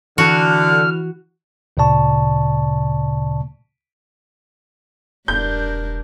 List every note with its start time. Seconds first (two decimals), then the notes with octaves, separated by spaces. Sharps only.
0.18 D3 E3 F#4 F6
1.77 D2 A#2 C#3 D5 A5 C#6
5.28 E1 G2 D4 A#4 G6